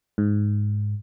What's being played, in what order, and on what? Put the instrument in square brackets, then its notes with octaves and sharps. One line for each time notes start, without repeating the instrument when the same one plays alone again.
[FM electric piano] G#2